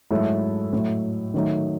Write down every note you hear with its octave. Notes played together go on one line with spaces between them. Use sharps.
G#2 F#3 A3 E4 A4
A2 F#3 A3
D#3 F#3 A3 D#4